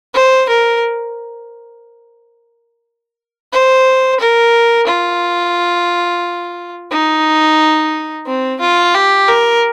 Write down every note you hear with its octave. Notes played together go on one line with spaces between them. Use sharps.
C5
A#4
C5
A#4
F4
D#4
C4
F4
G4
A#4